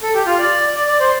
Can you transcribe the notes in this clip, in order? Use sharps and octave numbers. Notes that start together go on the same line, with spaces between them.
A4
G4
F4
D5
D5
D5
C5